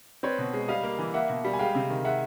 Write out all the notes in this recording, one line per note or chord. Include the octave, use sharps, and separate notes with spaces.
C4 B4 C#5
B2
G#3
G3 D#5 F5
A#3
E3
A#3 E5 F#5
B2
G3
G#5
G#3 F5 G5
C3
D#3
G#3 E5 F#5